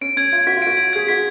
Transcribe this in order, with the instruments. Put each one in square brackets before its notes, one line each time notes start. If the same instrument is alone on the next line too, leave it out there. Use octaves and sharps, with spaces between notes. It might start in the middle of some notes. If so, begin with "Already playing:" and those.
[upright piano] C#4 [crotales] D7
[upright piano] C#4 [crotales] G#6
[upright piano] F4 [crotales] G#6
[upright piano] F#4 [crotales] B6
[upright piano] F4
[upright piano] F#4 [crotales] D7
[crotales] G#6
[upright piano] G#4 [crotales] G#6
[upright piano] F#4 [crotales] B6